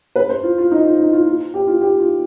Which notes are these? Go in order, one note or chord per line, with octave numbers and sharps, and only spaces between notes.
B4
C5
F4
F4
D#4
F4
D#4
F4
F4
G4
F4
G4
F4